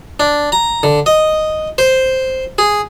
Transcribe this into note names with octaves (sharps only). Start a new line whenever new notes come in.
D4
A#5
D3
D#5
C5
G#4